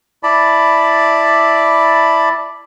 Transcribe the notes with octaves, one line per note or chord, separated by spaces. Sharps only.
E4 D5 A5 B5